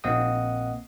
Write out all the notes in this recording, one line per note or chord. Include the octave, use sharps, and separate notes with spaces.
A#1 A#3 C4 D#5 F#5 D#6